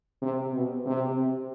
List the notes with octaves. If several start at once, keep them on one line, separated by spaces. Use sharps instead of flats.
C3
B2
C3